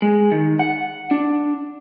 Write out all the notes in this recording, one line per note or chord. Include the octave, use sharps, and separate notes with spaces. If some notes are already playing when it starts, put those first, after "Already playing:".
G#3
D#3
F#5
D4